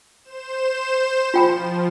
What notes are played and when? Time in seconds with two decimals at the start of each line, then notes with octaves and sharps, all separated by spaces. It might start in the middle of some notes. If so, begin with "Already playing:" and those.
0.22 C5 E7
1.34 F3 F4 G5 B5